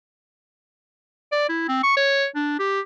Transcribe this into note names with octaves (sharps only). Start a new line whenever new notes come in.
D5
E4
C4
C#6
C#5
D4
G4